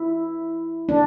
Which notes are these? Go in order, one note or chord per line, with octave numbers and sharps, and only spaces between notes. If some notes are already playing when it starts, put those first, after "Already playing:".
Already playing: E4
D4